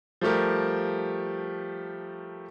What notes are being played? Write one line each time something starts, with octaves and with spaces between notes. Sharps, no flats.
F3 G3 A3 G4 A#4